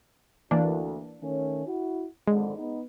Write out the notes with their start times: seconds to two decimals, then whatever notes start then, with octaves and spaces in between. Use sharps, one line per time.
0.51 D2 E3 A#3 D4
1.21 D#3 A3 C#4
1.65 E4 F#4
2.28 G#1 F2 D3 G#3
2.57 B3 D#4